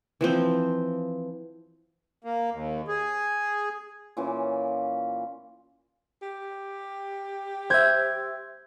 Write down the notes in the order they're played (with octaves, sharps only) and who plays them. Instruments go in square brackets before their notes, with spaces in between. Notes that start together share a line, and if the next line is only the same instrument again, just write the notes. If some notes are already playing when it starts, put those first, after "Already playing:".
[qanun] E3 F3 C4
[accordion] A#3
D#2
G#4
[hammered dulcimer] A#2 E3 C#4 F4
[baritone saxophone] G4
[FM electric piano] C5 E5 [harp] G6 G#6